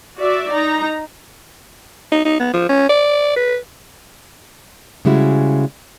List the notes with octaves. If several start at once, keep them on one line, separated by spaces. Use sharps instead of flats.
F#4 D5 E5
D#4 A#5
D#4
D#4
B3
F3
C#4
D5
B4
C#3 G3 G#3 E4 F#4